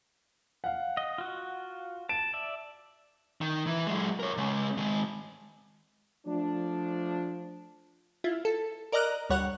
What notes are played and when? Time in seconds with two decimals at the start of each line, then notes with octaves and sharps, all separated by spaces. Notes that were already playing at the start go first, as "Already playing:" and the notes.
0.64 F5 F#5
0.97 D#5
1.18 F4 F#4
2.09 A5 D7
2.34 D5 E5
3.41 D#3
3.67 E3
3.87 F#3 G#3
4.20 A#4 C#5
4.37 C#3 G#3
4.78 D#3 G#3
6.26 F3 A3 D4
8.24 E4 F4
8.45 A4
8.92 A#4 D5 D#5 A#5 F6 F#6
9.30 D2 G3 C#5 F#5 F#6